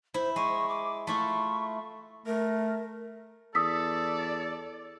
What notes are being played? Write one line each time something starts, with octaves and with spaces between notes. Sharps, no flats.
E4 C5
G#3 C#6
D6
A3 E4 F4 C#6
A3 A#4
E2 A4 D5 D#6 E6 B6